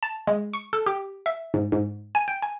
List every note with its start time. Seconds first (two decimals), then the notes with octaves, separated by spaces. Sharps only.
0.03 A5
0.27 G#3
0.53 C#6
0.73 A4
0.86 G4
1.26 E5
1.54 G#2
1.72 G#2
2.15 G#5
2.28 G5
2.42 G#5